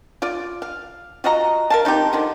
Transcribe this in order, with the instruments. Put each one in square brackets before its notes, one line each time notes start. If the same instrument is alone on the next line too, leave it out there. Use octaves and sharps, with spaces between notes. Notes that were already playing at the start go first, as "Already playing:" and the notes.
[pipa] F4 D5
F5
F4 F#4 D#5 A#5
A#4 F5 A5
C4 D#4 F4 G4
D3 D#3 F3